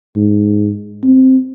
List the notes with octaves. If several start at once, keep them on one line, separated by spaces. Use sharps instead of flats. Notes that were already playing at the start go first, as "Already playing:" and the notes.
G#2
C4